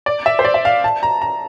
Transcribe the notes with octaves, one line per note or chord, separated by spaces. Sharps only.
D5
E5
C5
D5
E5
F5
A5
A#5
A#5